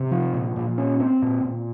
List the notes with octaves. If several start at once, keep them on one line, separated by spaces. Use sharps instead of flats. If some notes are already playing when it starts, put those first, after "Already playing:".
Already playing: C3
F3
A#2
A#2
C#4
C4
A#2
A#2